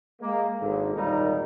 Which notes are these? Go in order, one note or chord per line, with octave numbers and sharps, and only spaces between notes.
G#3 A#3
G#1 G#2 D3
G#1 D#2 A#2 G3 D#4 A#4